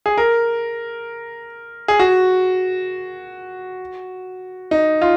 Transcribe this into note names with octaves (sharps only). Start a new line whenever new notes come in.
G#4
A#4
G#4
F#4
D#4
F4